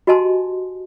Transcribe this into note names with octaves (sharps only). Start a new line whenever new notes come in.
F#4 G4 D#5 G#5 A5 C6